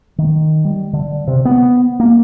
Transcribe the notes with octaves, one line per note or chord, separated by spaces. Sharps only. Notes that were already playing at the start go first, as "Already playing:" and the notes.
D#3
G3
D3
C3
B3
A#3